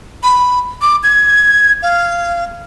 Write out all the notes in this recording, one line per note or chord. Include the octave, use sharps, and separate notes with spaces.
B5
D6
G#6
F5